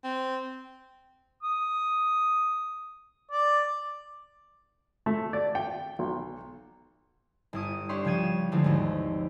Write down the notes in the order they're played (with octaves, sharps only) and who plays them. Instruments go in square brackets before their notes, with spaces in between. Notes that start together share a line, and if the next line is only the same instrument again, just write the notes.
[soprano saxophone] C4
[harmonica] D#6
D5
[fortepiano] A3
D5
G5
B1
[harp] G1 E4 D#6
D4 E4 G4 C#5 C6 C#6
C#2 F3 G5 G#6 D#7 E7
D3 E3 F3 G#3 A3 C4
G#1 D#2